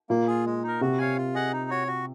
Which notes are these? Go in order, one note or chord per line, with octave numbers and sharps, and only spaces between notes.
A#2 A#3
F4 G#4
G#3
D#4 A#4
C3 F#4
C#5 F5 G#5
F4
G#4 D#5 F#5
D#4
F#4 C#5
F#4